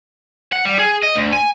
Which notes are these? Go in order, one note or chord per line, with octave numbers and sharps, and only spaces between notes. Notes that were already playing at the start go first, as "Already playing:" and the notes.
F#5
G3
G#4
D#5
D2
G#5